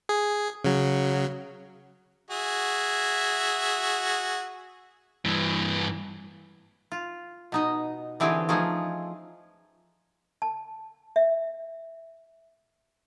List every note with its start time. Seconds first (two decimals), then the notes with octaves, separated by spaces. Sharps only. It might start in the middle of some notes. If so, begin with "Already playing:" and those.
0.09 G#4
0.65 C#3 F#3
2.30 F#4 G#4 E5
5.25 G2 E3
6.92 F4
7.52 B2 D#4 D#5
8.20 D3 E3 C4 G4 G#4
8.49 F3 A3 C#4 D#4 G#4
10.42 A5
11.16 E5